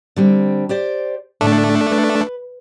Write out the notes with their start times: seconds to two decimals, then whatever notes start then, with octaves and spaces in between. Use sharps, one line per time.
0.16 D3 G3 C4
0.69 G4 C5 D5
1.41 A2 D3 A3 D4
1.90 B4